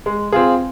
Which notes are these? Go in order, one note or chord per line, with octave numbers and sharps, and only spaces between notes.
G#3
C4 F4 G#4